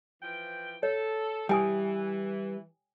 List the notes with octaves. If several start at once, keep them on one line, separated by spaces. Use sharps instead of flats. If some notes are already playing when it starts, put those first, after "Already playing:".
E3 F3 G5
A4 C#5
E3 G3 G5 G#5 D#6